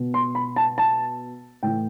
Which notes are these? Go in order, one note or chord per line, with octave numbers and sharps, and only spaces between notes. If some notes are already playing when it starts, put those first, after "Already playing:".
Already playing: B2
C6
B5
A5
A5
A2 E3 G5